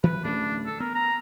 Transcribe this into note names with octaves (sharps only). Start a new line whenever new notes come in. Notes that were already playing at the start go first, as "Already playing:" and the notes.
E3 B4
D1 A3 C#4 D4
A4
B3 A#4
A#5